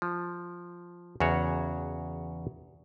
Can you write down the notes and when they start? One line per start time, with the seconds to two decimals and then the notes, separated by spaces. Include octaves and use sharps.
0.02 F3
1.20 E2 C#3 F#4 C#5